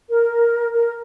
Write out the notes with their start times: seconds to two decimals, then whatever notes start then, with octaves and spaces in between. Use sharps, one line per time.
0.08 A#4
0.73 A#4